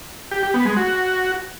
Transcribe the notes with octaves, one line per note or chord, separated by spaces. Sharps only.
G4
G4
B3
G#3
F#4